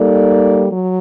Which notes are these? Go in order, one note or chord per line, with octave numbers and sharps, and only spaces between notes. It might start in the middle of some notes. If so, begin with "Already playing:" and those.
Already playing: G3 A#3 D#4 A4 D5
F#3